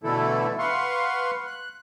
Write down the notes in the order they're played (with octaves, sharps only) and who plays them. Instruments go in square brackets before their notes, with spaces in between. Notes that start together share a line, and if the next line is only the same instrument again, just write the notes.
[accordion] B2 D3 E3 A3 E4 A4
B4 F5 F#5 C6 C#6
F#6